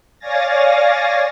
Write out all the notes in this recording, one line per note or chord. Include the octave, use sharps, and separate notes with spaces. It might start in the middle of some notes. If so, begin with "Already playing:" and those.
C#5 D5 F5 G#5 A6 A#6